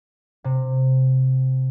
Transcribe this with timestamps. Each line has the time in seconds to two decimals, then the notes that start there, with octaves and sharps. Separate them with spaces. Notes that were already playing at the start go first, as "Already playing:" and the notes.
0.44 C3